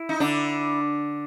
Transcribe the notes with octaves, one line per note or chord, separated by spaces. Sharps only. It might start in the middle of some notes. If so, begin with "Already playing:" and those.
Already playing: E4
D#4
D3 D4